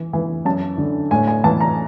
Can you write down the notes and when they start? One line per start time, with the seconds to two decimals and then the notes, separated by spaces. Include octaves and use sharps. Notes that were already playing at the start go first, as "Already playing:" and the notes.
Already playing: E3
0.13 E3
0.45 F#2 A5
0.78 D3
1.11 A2 G#5
1.27 G#5
1.44 E3 A5
1.60 A#5